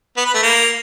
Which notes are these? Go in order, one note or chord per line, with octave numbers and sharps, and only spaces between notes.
B3
B4
A3
A#3